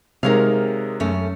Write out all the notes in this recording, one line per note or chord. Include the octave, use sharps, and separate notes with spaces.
C3 G#3 D#4 A#4 C#5 F5
F#2 A3 C#4